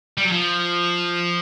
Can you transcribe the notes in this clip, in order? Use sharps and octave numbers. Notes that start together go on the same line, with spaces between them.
G3
F#3
F3